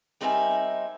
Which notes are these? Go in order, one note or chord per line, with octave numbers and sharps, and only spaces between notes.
G3 C4 D#4 A#4 E5 G#5